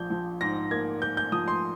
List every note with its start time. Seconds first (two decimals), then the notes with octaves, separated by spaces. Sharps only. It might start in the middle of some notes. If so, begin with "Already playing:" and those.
Already playing: A#1 F3 G6
0.10 F3
0.41 G#2 A#6
0.71 A#3 G#6
1.02 A#3 G6
1.17 G6
1.32 F3 D#6
1.48 C6